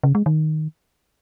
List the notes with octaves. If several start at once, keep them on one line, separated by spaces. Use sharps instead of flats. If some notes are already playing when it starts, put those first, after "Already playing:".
C#3
G#3
D#3